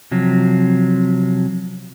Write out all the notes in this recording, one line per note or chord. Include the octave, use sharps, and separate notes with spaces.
C3 F3 F#3